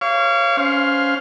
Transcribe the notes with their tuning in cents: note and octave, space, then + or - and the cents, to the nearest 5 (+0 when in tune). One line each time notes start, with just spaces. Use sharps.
C#5 -25 F5 -25 C#6 +35
C#4 +10 C5 +0 F5 +10